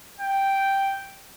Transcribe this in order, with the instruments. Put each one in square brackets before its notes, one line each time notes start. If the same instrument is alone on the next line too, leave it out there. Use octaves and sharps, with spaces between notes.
[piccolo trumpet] G5